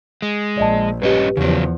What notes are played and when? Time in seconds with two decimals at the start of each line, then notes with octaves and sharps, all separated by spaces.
0.22 G#3
0.58 A#1 D5 D#5 A5
1.02 G2 C#4 G4 B4 D#5
1.37 E2 C#3 F3 F#3